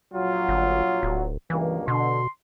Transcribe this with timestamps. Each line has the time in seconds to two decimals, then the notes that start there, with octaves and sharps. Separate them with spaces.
0.13 A#1 F#3 F4
0.49 G1
1.03 D1
1.50 C#2 G2 E3 A#3
1.88 B2 D3 C6